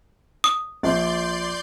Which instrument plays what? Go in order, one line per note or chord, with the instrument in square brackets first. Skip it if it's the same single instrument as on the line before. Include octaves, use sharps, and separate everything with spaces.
[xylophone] D#6
[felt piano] A#1 [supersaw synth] D5 C6 G6